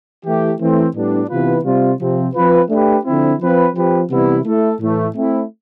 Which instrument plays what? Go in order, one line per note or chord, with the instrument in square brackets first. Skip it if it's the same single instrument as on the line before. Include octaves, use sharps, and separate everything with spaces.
[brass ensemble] E3 A3 E4 G4
E3 A3 C4
A2 G3 B3 D4
C3 E3 B3 F4 B4
C3 G3 C4 F4
C3 F3 C4
F3 C4 F4 B4
A3 D4 G4 B4
D3 F3 C4 E4
F3 C4 F4 B4
F3 C4 G4 B4
C3 E3 G3 B3 E4
A3 E4 A4
A2 E3 A3
A3 C4 E4